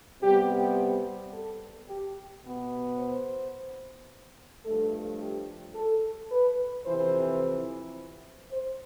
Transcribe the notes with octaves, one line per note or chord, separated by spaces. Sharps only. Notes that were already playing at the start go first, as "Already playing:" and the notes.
C3 G3 B3 G4
G4
A4
G4
B2 B3
C5
G2 F3 A3 A4
G4
A4
B4
F2 C3 E3 C5
C5